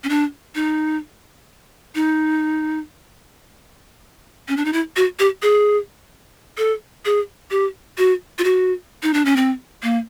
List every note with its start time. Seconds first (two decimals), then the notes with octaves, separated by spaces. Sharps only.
0.04 C#4
0.09 D4
0.55 D#4
1.95 D#4
4.49 C#4
4.57 D4
4.65 D#4
4.73 E4
4.96 F#4
5.19 G4
5.42 G#4
6.58 A4
7.05 G#4
7.51 G4
7.98 F#4
8.39 F4
8.44 F#4
9.03 D#4
9.14 D4
9.25 C#4
9.36 C4
9.83 A#3